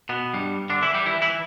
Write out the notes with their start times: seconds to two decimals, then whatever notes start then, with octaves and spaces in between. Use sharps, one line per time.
0.09 B2 B3
0.33 G2 G3
0.70 D3 D4
0.82 E3 E4
0.94 G3 G4
1.06 E3 E4
1.22 E3 E4